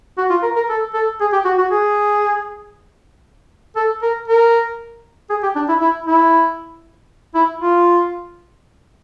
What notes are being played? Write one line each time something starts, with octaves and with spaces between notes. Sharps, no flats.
F#4
F4
A#4
A#4
A4
A4
G#4
G4
F#4
F#4
G#4
A4
A#4
A#4
G#4
G4
D4
E4
E4
E4
E4
F4